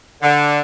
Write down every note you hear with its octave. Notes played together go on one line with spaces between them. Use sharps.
D3